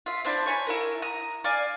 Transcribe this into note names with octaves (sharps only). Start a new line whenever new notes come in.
F4 E5
C4 D4 E4
C#5 G#5 A5 B5
E4 G4 A#4
A#5 D#6
D5 F5 G#5